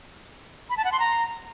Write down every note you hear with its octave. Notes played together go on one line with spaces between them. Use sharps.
B5
A5
F#5
C6
A#5